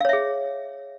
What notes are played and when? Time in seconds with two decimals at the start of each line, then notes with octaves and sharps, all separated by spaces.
0.01 F5
0.05 C#5
0.09 E5
0.13 G#4